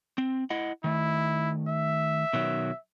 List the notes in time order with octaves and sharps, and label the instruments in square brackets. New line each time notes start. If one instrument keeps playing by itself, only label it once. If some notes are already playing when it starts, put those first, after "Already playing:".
[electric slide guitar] C4
E4 D#5 F#5
[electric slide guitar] D#3 A3 [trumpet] E4
[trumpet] E5
[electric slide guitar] B2 D#3 F#3